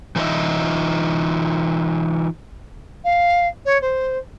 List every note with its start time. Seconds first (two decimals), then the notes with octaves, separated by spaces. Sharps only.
0.16 E3 D#4 F4 C5 D#5 E5
3.04 F5
3.65 C#5
3.81 C5